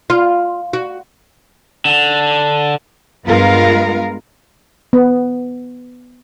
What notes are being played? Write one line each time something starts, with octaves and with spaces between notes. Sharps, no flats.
F4
F#4
D3
G2 G#3 B3 F4 A#4 F5
B3